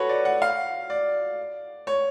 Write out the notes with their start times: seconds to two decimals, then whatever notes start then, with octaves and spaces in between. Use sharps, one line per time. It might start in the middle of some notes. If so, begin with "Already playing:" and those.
Already playing: F#4 A4 B4 C#5
0.09 D5
0.25 F#5
0.42 F5
0.90 D5
1.87 C#5